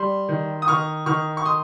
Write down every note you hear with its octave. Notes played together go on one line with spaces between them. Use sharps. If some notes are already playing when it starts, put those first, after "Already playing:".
Already playing: G3 C6
D#3
D#6
D#3 C#6 F6
D#3 C#6 F6
C#6
C6 D#6